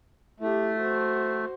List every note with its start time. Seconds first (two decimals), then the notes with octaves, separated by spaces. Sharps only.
0.40 A3 E4 G4
0.78 F#4 C5